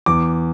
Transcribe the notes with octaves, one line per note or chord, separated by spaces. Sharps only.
E2 D6